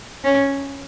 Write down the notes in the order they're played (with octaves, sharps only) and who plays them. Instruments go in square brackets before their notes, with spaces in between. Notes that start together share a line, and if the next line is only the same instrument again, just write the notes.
[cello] C#4